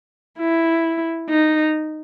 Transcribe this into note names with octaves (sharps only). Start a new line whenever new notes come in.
E4
D#4